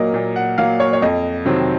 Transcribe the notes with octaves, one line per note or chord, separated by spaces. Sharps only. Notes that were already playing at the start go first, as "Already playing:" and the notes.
Already playing: A#2 F#3 A#3 A#4 D#5
A#2
F#5
F#3 A#3 F5
C#5
C#5
F2 D#5
C3 D#3 F#3 C4